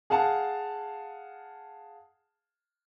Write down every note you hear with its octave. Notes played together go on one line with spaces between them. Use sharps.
G#4 F5 F#5 A5